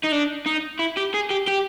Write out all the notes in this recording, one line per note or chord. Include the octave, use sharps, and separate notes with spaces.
D#4
D4
D#4
E4
G4
G#4
G4
G4